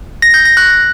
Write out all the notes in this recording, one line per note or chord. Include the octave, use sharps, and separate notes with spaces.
A#6
G6
A#6
F#6